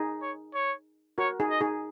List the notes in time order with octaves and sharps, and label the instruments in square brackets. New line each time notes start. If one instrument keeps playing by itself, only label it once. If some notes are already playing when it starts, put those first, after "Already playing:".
Already playing: [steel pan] D#4 G#4
[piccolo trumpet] C#5
C#5
[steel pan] F#4 A#4 [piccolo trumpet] C#5
[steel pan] D#4 G#4
[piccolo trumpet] D#5
[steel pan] D#4 G#4